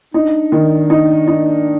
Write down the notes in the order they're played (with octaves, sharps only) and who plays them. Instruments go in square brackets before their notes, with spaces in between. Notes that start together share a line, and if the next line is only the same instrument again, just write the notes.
[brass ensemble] D4 [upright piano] D#4
[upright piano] D#3
D#4
D#4